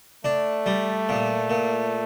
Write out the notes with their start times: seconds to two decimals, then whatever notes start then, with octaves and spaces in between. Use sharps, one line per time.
0.25 A3 D4
0.66 G3
1.09 A#2
1.50 A#2